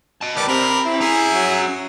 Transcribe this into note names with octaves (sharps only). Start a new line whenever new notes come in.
D#5 A5
G3 B3 G4 A#4 A5 D6
C3 C4 A#4 B5
E4
C#4 G#4 E5 G#5 A#5
F#3